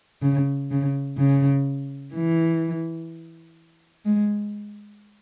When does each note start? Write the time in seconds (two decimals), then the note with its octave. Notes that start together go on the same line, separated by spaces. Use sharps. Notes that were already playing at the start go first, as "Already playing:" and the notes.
0.22 C#3
0.71 C#3
1.17 C#3
2.14 E3
4.05 G#3